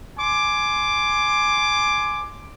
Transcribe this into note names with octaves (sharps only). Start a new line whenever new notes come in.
G#5 C6 D6